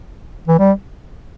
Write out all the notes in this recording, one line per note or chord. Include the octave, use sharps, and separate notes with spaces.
E3
G3